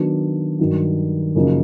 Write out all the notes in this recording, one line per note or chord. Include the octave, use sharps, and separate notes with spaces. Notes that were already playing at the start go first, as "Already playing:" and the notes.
Already playing: D#3 F#3 B3 D4
G2 D#3 F#3
F#2 C#3 F3 A#3 D#4